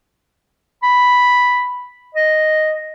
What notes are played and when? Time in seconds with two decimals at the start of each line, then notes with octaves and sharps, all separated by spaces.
0.83 B5
2.15 D#5